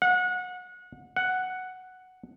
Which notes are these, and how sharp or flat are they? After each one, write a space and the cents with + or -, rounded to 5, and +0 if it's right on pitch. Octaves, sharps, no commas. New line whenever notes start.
F#5 -30
F#5 +0